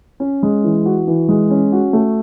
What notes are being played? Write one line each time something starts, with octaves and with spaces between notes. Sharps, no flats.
C#4
G#3
E3
F#4
E3
G#3
C#4
F#4
A3